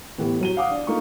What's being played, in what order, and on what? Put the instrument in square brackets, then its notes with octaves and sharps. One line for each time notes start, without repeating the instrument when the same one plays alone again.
[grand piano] A2 E3 B3 G4
F#3 D#7 G7
F5 F#5 D6 D#6
D4
A3 A#3 D#4 F4 C#6